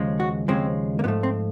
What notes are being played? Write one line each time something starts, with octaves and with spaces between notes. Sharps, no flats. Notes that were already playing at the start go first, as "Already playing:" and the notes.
Already playing: D#2 C#3 F3 G#3
F#4
D#2 C#3 F3 G#3 C4
A#3
G#2 F3 A3 B3
C4